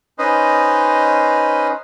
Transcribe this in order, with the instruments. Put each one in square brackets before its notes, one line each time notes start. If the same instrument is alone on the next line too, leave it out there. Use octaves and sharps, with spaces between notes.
[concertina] C#4 D#4 B4 C5 D#5